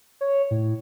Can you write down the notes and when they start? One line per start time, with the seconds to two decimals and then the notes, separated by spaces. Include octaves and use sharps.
0.21 C#5
0.51 A2